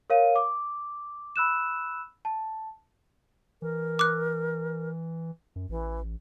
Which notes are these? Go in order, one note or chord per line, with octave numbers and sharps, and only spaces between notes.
A#4 C#5 F5 D#7
D6
B5 E6 F#6 E7
A5
E3 A#4
D6 F#6
F#2
A1 E3